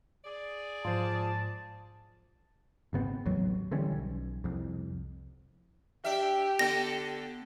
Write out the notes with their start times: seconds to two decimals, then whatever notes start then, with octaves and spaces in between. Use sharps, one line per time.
0.24 G#4 D5
0.85 G#2 F3 F4 C5 A5
2.93 G#1 C#3 B3 C4
3.26 A1 D#2 F#3
3.71 D3 E3 G3 C#4
3.92 B1
4.44 C2 F2
6.05 D4 G4 E5
6.59 D3 B3 A4 A#6